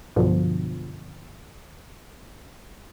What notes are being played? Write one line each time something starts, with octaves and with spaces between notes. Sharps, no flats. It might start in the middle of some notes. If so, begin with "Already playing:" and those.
B1 G2 B2 D3 F3